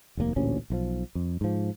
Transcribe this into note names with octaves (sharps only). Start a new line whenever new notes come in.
F1 D#2 C3 A#3
A1 D2 A#2 C#4
B1 D#3 F3
F2
G#2 F3